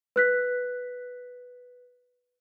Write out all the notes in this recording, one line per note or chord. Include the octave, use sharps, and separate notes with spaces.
B4 F#6 B6